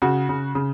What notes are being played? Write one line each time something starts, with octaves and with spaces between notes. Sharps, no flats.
C#3 F#4
C#3
C#3